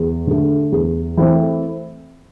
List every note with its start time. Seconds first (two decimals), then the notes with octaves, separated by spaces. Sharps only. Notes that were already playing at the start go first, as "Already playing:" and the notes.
Already playing: E2
0.27 D3 A3
0.72 E2
1.17 E3 A3 C4